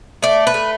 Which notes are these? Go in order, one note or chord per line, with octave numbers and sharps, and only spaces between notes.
A3 D5
B4
A3